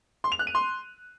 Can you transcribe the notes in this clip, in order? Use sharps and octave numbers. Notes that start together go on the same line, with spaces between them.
C6
F7
F#6
D#7
C6